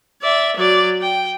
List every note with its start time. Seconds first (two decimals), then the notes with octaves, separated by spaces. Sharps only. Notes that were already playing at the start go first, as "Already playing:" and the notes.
0.22 D5 E5
0.56 F#3 D5
1.02 G5